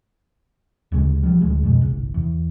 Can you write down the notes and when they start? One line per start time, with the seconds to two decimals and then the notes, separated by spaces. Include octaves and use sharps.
0.92 D2 C#3 G3 G#3
1.23 F3 G3
1.41 D1 D2 G#3
1.63 F2 B2 G#3
1.81 G1 C2
2.14 E2